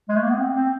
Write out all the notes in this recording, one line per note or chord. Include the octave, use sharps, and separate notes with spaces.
G#3
A3
A#3
B3
C4
C4